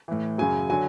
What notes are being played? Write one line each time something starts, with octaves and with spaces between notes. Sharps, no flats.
A2 E3
F#2 C#3 F#3 G#5
D3 F#3 G#5